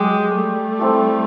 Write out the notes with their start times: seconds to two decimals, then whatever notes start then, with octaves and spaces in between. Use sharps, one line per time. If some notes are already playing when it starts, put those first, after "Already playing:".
Already playing: F#3 G#3 G4
0.34 G3 A3
0.79 C4 E4 A4